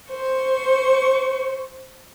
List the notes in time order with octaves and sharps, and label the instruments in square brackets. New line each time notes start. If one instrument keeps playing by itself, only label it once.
[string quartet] C5 C#6